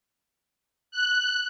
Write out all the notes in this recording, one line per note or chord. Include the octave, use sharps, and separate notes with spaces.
F#6